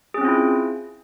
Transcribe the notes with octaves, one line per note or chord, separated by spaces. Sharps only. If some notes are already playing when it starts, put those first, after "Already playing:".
C4 C#4 E4 F4 G#4